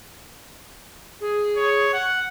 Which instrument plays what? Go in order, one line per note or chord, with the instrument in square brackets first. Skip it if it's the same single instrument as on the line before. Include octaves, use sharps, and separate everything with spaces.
[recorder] G#4
[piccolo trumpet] C#5
F#5